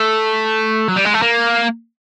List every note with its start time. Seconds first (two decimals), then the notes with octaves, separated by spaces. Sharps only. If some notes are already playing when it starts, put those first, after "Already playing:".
Already playing: A3
0.88 F#3
0.96 G3
1.05 G#3
1.14 A3
1.22 A#3